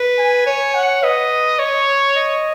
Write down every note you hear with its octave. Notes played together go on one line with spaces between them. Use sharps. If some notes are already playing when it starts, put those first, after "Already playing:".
Already playing: B4
G#5
C#5
F#5
B4 D#5
C#5
D#5